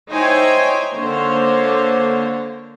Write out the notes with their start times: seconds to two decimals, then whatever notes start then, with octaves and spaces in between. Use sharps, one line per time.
0.10 D#4 E4 C5 C#5 G5 G#5
0.94 D3 A#3 C5 C#5